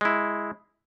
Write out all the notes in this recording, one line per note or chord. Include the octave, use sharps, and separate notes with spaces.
G#3 E4